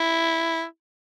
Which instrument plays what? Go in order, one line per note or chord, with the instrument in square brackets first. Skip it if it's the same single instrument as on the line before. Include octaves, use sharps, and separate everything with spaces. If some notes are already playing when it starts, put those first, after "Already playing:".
Already playing: [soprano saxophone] E4